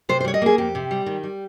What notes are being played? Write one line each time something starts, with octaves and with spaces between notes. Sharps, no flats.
C3 C5
C5
G3 C#5
D#5
A#3 G#4
F2 G4
C3
G3
D#3
G3